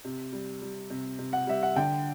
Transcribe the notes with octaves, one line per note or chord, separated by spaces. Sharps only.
C3
G3
G3
C3
C3
F#5
G3 E5
F#5
D3 G5